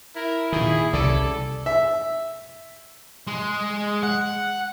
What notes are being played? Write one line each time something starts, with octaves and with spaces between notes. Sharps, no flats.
E4 A#4
A#2 D#3 G#4
C2 C#3 A4 D5
E5
G#3
F#5